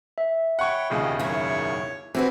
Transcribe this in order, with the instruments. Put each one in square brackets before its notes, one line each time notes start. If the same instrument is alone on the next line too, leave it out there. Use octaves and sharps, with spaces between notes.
[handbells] E5
[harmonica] C#5 G5 B5 [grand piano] F#5 C#6
[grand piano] E1 D#2 C#3 [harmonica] F3 G4 D#5
[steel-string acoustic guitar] F#2 E4 [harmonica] D#3 C#5 C#6
[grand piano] E3 [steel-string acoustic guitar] C4 F#4 B4 [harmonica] E4